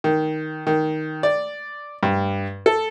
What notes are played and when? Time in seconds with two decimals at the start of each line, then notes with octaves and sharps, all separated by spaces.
0.04 D#3
0.67 D#3
1.23 D5
2.03 G2
2.66 A4